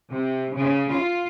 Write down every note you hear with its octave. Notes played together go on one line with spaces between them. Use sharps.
C3
C#3
F4